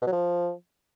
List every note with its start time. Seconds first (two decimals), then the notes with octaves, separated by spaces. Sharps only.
0.02 B2
0.07 F#3
0.12 F3